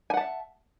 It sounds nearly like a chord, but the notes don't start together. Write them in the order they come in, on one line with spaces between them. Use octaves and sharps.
G#5 F#5 A5 E5